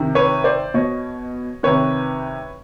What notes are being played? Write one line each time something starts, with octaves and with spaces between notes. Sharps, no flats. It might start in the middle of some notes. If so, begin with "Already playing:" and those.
Already playing: C3 D#3
B4 C#5
C5 D5
B2 C#5 D#5
C3 D#3 B4 C#5